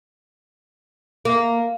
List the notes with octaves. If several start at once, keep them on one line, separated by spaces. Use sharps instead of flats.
A#3